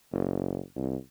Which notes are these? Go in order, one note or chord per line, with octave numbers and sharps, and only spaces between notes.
F#1
C2